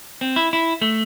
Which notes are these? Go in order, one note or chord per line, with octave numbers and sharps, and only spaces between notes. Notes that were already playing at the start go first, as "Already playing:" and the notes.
C4
E4
E4
A3